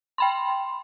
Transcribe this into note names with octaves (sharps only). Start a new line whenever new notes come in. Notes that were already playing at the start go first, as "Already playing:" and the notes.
G5 B5 C6